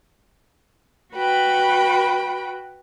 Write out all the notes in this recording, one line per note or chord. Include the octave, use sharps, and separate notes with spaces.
F#4 B4 G5 B5